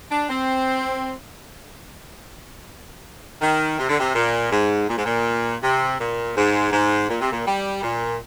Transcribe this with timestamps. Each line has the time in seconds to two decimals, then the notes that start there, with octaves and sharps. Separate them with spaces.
0.10 D4
0.29 C4
3.42 D#3
3.78 C3
3.89 D3
3.99 C3
4.15 A#2
4.51 G#2
4.89 A#2
4.97 G#2
5.05 A#2
5.62 C3
5.99 A#2
6.36 G#2
6.72 G#2
7.09 A#2
7.20 C3
7.31 A#2
7.45 G3
7.83 A#2